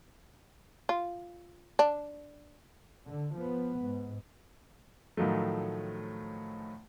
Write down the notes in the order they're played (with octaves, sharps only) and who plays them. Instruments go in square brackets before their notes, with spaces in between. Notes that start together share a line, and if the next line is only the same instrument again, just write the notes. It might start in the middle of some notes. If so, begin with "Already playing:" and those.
[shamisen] F4
D4
[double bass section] D3
F3 B3
G#2
[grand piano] A2 D#3 F3 F#3 A3